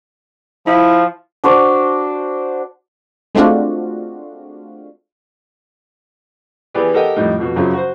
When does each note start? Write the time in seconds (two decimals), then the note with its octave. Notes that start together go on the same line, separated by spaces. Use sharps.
0.67 F3 E4
1.44 D4 F#4 C5 D5
3.35 G#3 A3 C4 D4 F4 F#4
6.74 E3 B3 G4 G#4 B4 D5
6.94 G4 A4 A#4 D#5 F#5 G5
7.16 F2 A2 G3 D#4
7.39 F2 B2 F#4
7.56 F#2 C#3 F3 F#3
7.73 F#4 C5